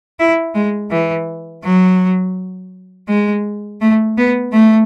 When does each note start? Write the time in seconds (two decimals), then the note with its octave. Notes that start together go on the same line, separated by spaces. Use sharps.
0.19 E4
0.55 G#3
0.91 E3
1.64 F#3
3.08 G#3
3.81 A3
4.18 B3
4.53 A3